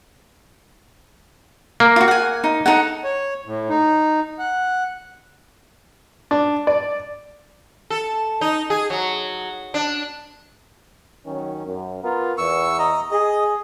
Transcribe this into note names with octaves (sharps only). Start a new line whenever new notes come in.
A#3
F4 F#4
F#5 G#5
D#4
D#4 A4 F#5
C#5
A2
D#4
F#5
D4
D5
A4
D#4
G#4
F#3
D4
D#3 F#3 C#4
F#2
B3 F4 A#4
E2 C#6 E6
D#5 A#5
G#4 D#5